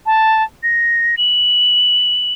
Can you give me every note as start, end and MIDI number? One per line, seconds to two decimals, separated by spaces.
0.06 0.43 81
0.63 1.15 94
1.17 2.33 102